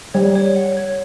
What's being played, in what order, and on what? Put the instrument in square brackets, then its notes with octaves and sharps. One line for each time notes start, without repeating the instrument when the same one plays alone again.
[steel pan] G3 [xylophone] C#5
[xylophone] C#5
F#5
C#5